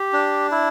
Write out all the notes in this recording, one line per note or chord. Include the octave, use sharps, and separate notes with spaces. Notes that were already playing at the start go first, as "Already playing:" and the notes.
Already playing: G4
D4
E4